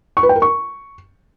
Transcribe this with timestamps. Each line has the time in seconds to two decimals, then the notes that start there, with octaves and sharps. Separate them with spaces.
0.17 C#6
0.23 B4
0.29 G5
0.36 A#4
0.42 C#6